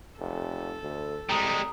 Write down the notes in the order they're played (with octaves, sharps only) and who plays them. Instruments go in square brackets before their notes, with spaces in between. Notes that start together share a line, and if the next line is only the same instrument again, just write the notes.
[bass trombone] F1 [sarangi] A4
[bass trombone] D2
[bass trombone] C2 [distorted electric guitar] G3 G#3 [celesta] A#5 D#6